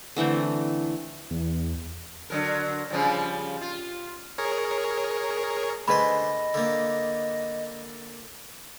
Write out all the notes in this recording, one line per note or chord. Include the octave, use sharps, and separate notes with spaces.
D3 E3 A3 C4
E2
D3 F#3 A#4
C#3 F3 G3
F4
G#4 A#4 C#5
D3 A3 G#4 B4 C5 D#5 B5
D3 A#3